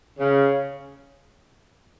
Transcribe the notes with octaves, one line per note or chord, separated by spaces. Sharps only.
C#3